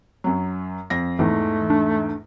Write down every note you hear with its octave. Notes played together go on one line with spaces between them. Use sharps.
F#2 F#3
F2 A#6
E2 G#2 E3 A3
D4